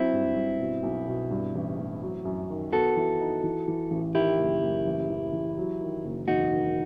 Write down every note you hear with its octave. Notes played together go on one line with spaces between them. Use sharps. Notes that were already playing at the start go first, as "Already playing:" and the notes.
Already playing: F#3 C4 E4
G2
G2
B2
B1
B2
G2
A1
A1
F#3
F#2
D#3
B3 F#4 A4
E3
D#4
E3
E3
A1
D#3 E4 G4
F#1
F#1
A1
E3
E3
F#3
D#3
F#1
E1 D#4 F#4
D#3